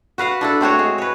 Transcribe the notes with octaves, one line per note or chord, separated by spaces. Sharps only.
F#4 B4 F5 F#5
D4 E4 A4
A3 C4 F#4 C#5
G#3
B4 C#5